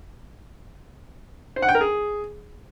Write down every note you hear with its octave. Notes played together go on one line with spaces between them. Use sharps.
C5
F#5
G5
A#4
G#4